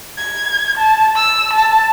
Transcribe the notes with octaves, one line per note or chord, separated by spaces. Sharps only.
G#6
A5
E6
A5